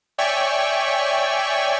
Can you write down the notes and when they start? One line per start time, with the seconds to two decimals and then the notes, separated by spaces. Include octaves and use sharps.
0.18 C#5 D5 E5 G5 G#5 C#6